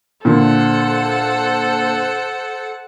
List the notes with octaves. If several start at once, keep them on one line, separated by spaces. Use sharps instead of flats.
A#2 D3 A4 C5 F#5